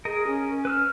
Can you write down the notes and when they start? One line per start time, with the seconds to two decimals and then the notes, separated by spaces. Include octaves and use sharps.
0.05 G#4 A#4 D#5
0.27 C#4
0.65 B4 E6 F6